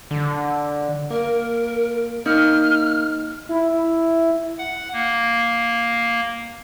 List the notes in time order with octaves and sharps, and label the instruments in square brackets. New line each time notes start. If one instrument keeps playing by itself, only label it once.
[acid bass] D3
[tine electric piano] A#3 [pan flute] A#4
[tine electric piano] A#3 [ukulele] D#4 [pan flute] F6
[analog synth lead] E4
[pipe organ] F#5
A#3